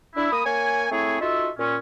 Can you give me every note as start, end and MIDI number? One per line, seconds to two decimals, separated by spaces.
0.16 0.30 62
0.16 0.30 64
0.32 0.45 58
0.32 0.45 83
0.32 0.45 87
0.45 0.86 58
0.45 0.86 73
0.45 0.86 80
0.92 1.18 57
0.92 1.18 60
0.92 1.18 64
0.92 1.18 68
0.92 1.18 73
1.21 1.49 63
1.21 1.49 65
1.21 1.49 66
1.21 1.49 69
1.21 1.49 76
1.58 1.76 46
1.58 1.76 61